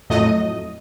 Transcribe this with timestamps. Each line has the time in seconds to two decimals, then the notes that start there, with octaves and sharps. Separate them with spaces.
0.10 F2 A2 F#3 A3 D#5